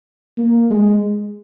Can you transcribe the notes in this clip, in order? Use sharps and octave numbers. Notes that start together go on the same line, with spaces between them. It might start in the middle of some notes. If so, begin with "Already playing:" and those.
A#3
G#3